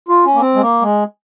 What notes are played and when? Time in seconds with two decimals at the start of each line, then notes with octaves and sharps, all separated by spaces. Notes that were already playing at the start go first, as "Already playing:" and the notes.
0.09 F4
0.25 C#4
0.34 A#3
0.40 C4
0.55 G#3
0.62 A#3
0.82 G#3